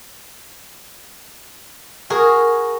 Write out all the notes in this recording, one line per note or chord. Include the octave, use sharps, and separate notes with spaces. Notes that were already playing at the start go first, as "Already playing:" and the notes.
F#4 G#4 A#4